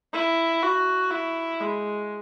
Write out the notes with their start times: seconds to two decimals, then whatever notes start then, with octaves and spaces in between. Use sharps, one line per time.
0.13 E4
0.63 F#4
1.11 E4
1.61 G#3